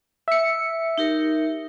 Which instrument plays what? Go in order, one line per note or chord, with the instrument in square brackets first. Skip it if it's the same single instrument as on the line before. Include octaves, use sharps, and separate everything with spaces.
[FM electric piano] E5 C#7
[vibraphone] D#4 G4 A#4